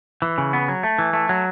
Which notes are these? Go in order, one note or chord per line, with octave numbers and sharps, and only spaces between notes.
E3
C#3
B3
F#3
A3
E3
A3
F#3